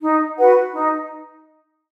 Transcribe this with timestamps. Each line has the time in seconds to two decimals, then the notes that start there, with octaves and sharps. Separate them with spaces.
0.01 D#4
0.38 F#4 B4 F#5
0.74 D#4